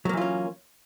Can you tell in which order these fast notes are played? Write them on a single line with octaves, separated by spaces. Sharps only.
F#3 A#3 E3 F4 C#4